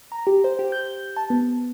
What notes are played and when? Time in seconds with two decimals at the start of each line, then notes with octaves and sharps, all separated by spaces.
0.12 A#5
0.27 G4
0.44 C5
0.59 G4
0.72 G6
1.17 A5
1.30 B3